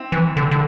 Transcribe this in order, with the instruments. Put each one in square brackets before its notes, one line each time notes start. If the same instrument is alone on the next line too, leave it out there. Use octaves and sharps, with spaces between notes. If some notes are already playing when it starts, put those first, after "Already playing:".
Already playing: [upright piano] C4 E4
[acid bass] E3
D3
D3